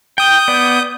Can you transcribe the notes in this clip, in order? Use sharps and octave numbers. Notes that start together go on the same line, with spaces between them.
G5 D#6 G6
B3 D5